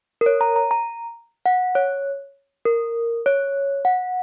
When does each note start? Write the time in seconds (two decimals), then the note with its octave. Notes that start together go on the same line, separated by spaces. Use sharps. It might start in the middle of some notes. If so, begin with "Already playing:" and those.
0.21 A#4
0.26 C#5
0.41 A#5
0.56 A#5
0.71 A#5
1.46 F#5
1.75 C#5
2.65 A#4
3.26 C#5
3.85 F#5